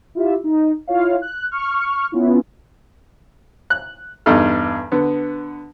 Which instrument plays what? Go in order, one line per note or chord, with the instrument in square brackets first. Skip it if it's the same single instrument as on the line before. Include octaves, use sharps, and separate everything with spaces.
[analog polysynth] E4 F4 G4 E5
D#4
E4 F4 C#5 F5
F#6
C#6 F6
B3 C#4 E4 F4
[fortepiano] F#6
E2 G2 D#4 A4 F6
D3 B3